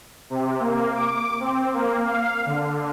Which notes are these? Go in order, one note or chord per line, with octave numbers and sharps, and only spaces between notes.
C3
A#3
D6
C4
A#3
F5
D3